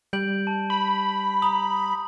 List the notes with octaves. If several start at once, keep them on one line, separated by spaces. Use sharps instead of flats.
G3 G6 D7 F#7
A5
B5
A#5 D#6 F#7